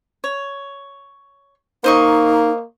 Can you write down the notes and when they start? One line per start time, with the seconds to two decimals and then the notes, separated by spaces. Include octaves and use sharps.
0.24 C#5
1.84 A#3 D#4 C5 D#5 C#6